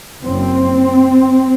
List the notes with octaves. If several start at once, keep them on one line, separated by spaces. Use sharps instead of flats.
F#1 F#2 C4